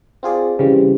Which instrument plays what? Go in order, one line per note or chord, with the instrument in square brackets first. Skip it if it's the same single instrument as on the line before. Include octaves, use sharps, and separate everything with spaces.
[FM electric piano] C4 F4 G#4 D5
C#3 E3 G3 C4